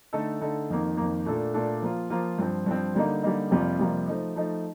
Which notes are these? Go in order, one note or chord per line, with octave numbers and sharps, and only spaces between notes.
D3 A3 D#4 A4
D3 A3 D#4 A4
F2 D#3 A#3
F2 D#3 A#3
A#2 A3 D4 A4
A#2 A3 D4 A4
F3 A#3 F4
F3 A#3 F4
G2 F3 C4
G2 F3 C4
D3 G3 A#3 D#4
D3 G3 A#3 D#4
F2 C3 G3 A#3 F4
F2 C3 G3 A#3 F4
F3 A3 D#4
F3 A3 D#4